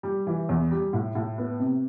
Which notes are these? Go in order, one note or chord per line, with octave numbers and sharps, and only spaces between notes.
G3
E3
E2
G3
A2
A2
B3
C3